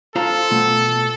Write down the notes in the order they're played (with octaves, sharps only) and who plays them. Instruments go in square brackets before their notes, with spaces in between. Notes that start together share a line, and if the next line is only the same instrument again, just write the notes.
[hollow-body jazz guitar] F4 C5 A#5 [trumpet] A4
[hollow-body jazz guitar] B2 A3